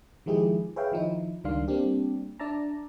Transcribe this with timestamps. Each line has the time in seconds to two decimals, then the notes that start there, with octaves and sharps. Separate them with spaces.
0.26 D#3 F3 G#3 E4 G4 G#4
0.76 G#4 B4 C#5 E5 F5 G5
0.92 D#3 F3 D#4 E4
1.44 C#2 D#3 G3 D4 F5 C6
1.68 G3 A#3 C4 D4 G4
2.40 D4 D5 E5 A5 A#5